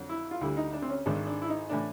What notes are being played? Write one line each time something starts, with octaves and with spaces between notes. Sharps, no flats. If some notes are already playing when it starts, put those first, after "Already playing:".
Already playing: F2 D3 F#3
E4
F4
D2 D3 G3 E4
D#4
D4
C4
C#4
G#1 G#2 D#3 G#3 D4
D4
E4
D#4
A2 E3 D4